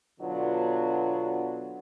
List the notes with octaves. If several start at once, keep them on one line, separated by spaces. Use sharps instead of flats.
B2 D3 F#3 B3 D4 F4